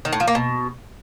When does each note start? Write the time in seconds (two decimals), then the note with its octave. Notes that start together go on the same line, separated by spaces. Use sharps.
0.05 D#3
0.13 A2
0.20 F3
0.28 A#3
0.35 B2